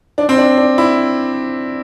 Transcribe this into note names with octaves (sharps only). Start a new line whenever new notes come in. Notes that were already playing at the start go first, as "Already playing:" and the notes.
D4
C4
D4
D4
E4